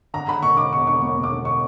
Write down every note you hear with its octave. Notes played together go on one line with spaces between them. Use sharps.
D3 A#5
D3 B5
E1 C#6
D3 D6
E1 C#6
D3 C#6
E1 C#6
E1
D6
D3
C#6